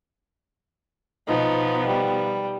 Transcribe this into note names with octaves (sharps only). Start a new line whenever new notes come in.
B2 F3 B3 D#4
G3